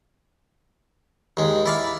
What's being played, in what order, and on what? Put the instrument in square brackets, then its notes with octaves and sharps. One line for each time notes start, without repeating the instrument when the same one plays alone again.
[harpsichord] D#2 G#3
E4 D5 F5